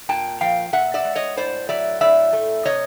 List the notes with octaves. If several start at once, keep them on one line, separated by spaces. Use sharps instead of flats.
A#2 G5 A5
F3 F5 G5
A#2 E5 F#5
D5 E5
G#3
C#5 D#5
A2 C5 D5
F#3 D5 E5
A2 D5 E5
A3
C3 C#5 D#5